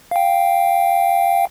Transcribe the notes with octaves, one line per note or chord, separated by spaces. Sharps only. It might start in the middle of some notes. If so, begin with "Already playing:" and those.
F5 G5